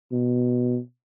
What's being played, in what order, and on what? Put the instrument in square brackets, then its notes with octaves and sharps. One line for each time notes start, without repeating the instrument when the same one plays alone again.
[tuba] B2